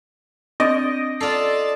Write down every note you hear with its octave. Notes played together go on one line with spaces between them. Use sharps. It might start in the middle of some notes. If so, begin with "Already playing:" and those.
C4 D4 D#5 D7
F4 A4 D5 A5 C7